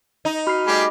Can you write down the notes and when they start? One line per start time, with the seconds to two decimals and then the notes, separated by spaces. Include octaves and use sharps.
0.25 D#4
0.47 F#4 B5 F6 C7
0.67 G3 A3 G4 G#4 D#5 B5 D6